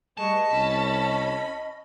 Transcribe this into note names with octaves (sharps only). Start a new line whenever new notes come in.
G3 A3 G#4 B4 D#5 A5 C#6
C2 C#4 C#5 B5